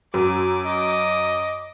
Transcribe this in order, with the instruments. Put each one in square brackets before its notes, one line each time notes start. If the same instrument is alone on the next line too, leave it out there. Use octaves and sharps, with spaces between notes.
[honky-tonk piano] F#2 [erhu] D6
[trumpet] D#5